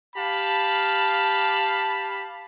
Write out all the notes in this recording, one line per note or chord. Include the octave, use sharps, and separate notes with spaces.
G4 F5 A5 B5